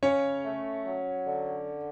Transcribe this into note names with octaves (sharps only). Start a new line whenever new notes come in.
C#3 C#4 C#5
A3
F#3
D3